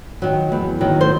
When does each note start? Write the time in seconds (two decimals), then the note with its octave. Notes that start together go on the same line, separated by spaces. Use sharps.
0.22 D#3 F#3
0.52 E2
0.81 D#3 F#3
1.01 C5